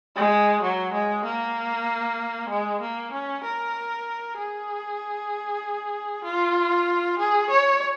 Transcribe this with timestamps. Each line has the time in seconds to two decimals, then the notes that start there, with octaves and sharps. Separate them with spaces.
0.16 G#3
0.62 F#3
0.93 G#3
1.24 A#3
2.49 G#3
2.81 A#3
3.12 C#4
3.43 A#4
4.37 G#4
6.24 F4
7.19 G#4
7.50 C#5